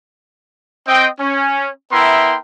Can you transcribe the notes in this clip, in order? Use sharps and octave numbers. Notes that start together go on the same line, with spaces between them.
C4 D#5 G5
C#4
B3 E4 A#4 E5 G5 C6